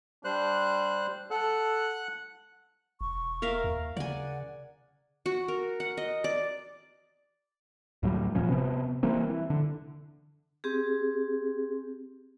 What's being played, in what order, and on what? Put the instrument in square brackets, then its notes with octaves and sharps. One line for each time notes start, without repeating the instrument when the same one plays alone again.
[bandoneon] G3 C5 F#6 [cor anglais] D4
[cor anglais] A4 [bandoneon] F#5 F#6
[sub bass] E1 [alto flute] C#6
[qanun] A#4 E5 F5
[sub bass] D#2
[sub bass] C#3 [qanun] D5 G#5 [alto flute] F#5
[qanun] F#4
A#4
F#5
D#5
D5
[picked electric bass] D2 A2 F#3 G3
D#1 A#2 F3 C#4
C3 B3
E3 G3 A#3 C4
E3
D3
[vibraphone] C4 G4 G#4